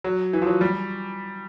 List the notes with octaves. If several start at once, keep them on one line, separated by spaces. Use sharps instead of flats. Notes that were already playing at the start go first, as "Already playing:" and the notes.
F#3
E3
F3
F#3
G3